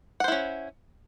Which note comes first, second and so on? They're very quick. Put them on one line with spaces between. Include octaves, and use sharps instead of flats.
F#5 C5 E4 C#4